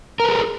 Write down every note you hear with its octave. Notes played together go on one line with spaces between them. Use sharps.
G#4 A#4 B4